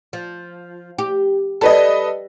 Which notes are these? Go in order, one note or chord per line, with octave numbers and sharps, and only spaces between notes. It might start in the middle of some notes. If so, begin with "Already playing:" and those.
F3
G4
G3 A4 B4 D#5